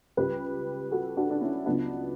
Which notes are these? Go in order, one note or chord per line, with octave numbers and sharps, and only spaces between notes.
C#2 C#3 G3 G4 B4
F#4 A4
D4 F#4
D4
C#4 E4
C#2 C#3 F#3 B3 D4